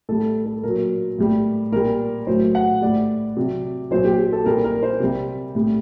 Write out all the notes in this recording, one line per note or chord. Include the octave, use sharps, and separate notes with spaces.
A2 G3 A4
A4
A#2 F#3 A#4
A2 G3
A#2 G3 A#4
A2 F#3 C5
F#5
A2 G3 D5
C3 F#3
A#2 F#3 C5
G4
G4
A4
A#2 G3 A#4
A#4
C5
C3 G3
A2 G3